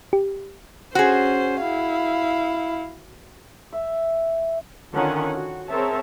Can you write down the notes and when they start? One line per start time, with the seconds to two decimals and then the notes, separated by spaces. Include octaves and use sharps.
0.13 G4
0.95 C#4 F#4 G#4 C5
1.61 E4 F5
3.73 E5
4.93 D3 D#3 C#4 F4 F#5 G#5
5.36 F#4
5.68 C4 G#4 A#4 C#5 E5 A5